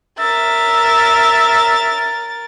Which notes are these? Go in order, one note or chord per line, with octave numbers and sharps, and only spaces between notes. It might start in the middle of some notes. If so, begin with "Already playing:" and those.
A#4 E5 A6